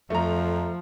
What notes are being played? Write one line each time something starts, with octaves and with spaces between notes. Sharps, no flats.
F2 F3 A3 A#5